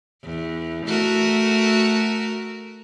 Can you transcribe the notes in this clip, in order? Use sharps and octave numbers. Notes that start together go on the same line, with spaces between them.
E2
A3 F#4 A#4